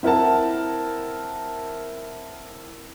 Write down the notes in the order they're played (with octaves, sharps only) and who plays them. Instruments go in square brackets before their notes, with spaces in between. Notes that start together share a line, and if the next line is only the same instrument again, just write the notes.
[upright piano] C4 E4 A#4 F#5 A5